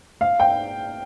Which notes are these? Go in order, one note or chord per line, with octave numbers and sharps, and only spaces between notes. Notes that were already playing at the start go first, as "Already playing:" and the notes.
F5
G5